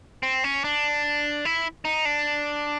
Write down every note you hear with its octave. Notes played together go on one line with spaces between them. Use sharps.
C4
C#4
D4
E4
D#4
D4